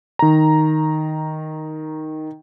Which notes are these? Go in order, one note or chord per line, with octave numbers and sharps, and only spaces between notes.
D#3 A#5